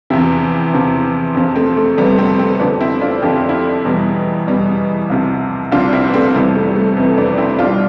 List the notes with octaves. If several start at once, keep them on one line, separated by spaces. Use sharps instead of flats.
E2 C3 F3 C4 E4
E2 C3 F3
F2 C3 F3
A3 C4
A3
F2 C3 F3 G3 B3
A3 C4
A3 C4
F2 D3 F3 B3 D4
C4 E4
D4 F4
F2 D3 F3 G4
F4
E4 G4
E2 B2 G3
E2 B2 G3
C2 C3 F3
C2 C3 F3 D4 F4
C4 E4
B3
A3 C4
F2 C3 E3 G3 B3
A3
G3
A3
F2 C3 E3
B3 D4
C4 E4
C2 B2 G3 D4 F4